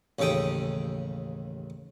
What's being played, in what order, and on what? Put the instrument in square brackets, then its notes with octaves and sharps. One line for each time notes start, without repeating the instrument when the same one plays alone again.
[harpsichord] A1 D#2 C#3 A4 G5 D#6